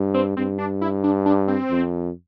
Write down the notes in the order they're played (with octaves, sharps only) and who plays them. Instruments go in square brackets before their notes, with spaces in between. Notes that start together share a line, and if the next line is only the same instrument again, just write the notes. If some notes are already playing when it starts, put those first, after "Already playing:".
Already playing: [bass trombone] G2
[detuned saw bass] C4
[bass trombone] G2 [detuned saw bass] C4
[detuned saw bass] D4
E4
D4
D4
C4
[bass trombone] F2